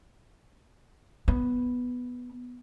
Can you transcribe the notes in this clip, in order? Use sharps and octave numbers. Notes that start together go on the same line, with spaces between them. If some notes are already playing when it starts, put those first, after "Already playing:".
B3